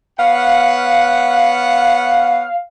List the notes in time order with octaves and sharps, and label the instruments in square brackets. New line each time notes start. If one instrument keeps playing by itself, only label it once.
[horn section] B3 C#5 F#5 [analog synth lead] F5